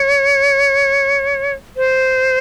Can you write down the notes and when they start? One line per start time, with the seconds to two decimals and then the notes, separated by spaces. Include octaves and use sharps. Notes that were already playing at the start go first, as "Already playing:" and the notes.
Already playing: C#5
1.77 C5